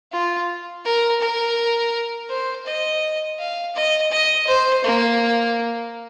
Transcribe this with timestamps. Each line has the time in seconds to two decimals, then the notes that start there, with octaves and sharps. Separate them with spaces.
0.12 F4
0.85 A#4
1.21 A#4
2.29 C5
2.66 D#5
3.39 F5
3.75 D#5
4.11 D#5
4.47 C5
4.84 A#3